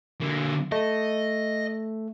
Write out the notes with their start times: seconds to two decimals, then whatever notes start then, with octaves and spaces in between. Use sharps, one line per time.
0.21 D3 A#3
0.72 A3 D#5